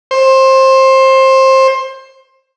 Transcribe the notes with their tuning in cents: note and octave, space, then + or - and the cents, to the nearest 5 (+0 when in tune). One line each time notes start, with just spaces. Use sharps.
C5 +20